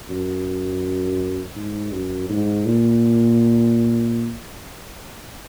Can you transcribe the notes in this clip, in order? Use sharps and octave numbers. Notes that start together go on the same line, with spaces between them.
F#2
G#2
F#2
G#2
A#2